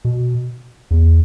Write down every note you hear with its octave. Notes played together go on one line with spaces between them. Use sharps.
B2
E2